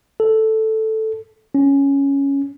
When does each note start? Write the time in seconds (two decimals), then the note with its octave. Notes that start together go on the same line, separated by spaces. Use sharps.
0.20 A4
1.55 C#4